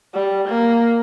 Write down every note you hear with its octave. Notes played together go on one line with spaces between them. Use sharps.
G3
A#3